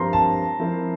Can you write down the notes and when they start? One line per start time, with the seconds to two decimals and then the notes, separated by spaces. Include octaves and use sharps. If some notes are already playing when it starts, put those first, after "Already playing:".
Already playing: G2 F3 C4 G4 A#4 A#5 C6
0.13 A5
0.59 F3 C4 E4 A#4